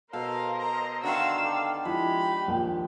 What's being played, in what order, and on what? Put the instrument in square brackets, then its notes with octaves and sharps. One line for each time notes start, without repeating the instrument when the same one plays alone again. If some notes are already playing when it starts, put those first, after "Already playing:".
[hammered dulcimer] B2 A4 [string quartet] A#4 C5 D#5 [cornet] F5
[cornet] A#5
[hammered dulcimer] D3 D#3 C6 [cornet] F#4 [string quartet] F5 E6
[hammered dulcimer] G4 [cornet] A4
[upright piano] F3 E4 [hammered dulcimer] G#3 [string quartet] G4 [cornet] B5
[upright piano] A#1 D#2 G5